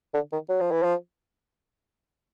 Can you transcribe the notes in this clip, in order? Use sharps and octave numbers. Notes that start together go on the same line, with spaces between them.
D3
D#3
F#3
F3
E3
F3